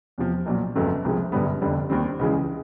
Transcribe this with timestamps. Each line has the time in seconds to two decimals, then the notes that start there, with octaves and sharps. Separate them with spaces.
0.18 E2 C3 F3
0.46 B1 A#2 F#3
0.75 G1 F2 C#3 F#3 A3
1.05 C2 C3 F3 G#3
1.32 G1 F#2 D3 G3 B3
1.62 F1 F2 D3 G3
1.90 D#2 D#3 G3 C4
2.19 C#2 C#3 E3 G#3